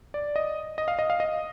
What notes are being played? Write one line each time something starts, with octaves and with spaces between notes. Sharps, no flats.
D5
D#5
D#5
F5
D#5
F5
D#5